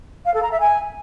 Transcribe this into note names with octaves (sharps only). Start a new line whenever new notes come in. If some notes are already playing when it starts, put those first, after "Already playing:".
F5
A4
A#5
E5
G#5